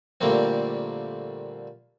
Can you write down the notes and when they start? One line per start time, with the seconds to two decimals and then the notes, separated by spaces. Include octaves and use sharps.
0.21 A#2 D3 G3 A3 A#3 C4